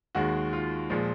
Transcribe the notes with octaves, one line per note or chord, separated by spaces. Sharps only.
D#2 D#3 G#3 F#4
F4
A#2 F3 G#3